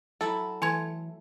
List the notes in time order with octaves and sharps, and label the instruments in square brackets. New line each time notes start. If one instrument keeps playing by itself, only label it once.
[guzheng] F#3 E4 B5 [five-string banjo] A4
[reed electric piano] E3 [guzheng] A3 [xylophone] G#5 C6 G#6